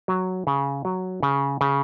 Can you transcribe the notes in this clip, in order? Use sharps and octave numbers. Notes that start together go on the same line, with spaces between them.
F#3
C#3
F#3
C#3
C#3